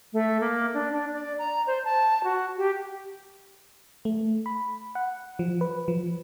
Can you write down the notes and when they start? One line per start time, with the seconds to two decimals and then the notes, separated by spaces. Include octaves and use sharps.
0.13 A3
0.40 A#3
0.74 D4
0.92 D4
1.12 D5
1.38 A#5
1.67 C5
1.85 A5
2.24 F#4
2.58 G4
4.05 A3
4.46 B5
4.95 F#5
5.39 F3
5.61 B4
5.88 F3